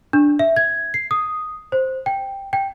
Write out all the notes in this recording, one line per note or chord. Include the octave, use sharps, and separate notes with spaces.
D4
E5
G#6
C7
D#6
C5
G5
G5